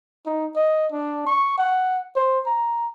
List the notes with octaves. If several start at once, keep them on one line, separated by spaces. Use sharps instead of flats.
D#4
D#5
D4
C#6
F#5
C5
A#5